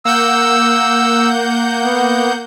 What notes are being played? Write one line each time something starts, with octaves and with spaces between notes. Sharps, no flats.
A#3 F#5 E6 G6
B3